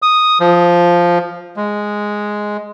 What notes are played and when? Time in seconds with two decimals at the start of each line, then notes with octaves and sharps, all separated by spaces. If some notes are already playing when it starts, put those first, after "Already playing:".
0.02 D#6
0.40 F3
1.56 G#3